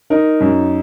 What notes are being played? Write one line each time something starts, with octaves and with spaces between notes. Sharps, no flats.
D#4 A#4
F#2